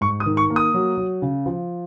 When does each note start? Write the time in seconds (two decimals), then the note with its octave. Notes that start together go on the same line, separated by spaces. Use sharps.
0.01 G#2 C#6
0.20 D#6
0.26 D#3
0.37 C#6
0.50 A#3
0.56 D#6
0.74 F#3
0.98 F#3
1.22 C#3
1.46 F3